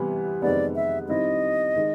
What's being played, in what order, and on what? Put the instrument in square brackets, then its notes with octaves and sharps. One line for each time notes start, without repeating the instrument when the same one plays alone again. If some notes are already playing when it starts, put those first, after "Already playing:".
Already playing: [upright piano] C3 E3 G3 B3 E4
[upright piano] F2 C3 D#3 G#3 B3 [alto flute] D5
[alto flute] E5
[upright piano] D#3 G3 C4 E4 [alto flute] D#5
[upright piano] D#3 G#3